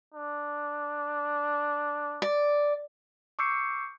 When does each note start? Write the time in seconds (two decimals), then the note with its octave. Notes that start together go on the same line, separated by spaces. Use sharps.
0.14 D4
2.22 D5
3.39 C#6 D6 E6 G6 C7 C#7